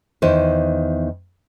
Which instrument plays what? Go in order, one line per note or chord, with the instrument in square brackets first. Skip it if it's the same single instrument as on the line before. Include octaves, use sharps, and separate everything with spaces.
[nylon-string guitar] E2 D#3 C5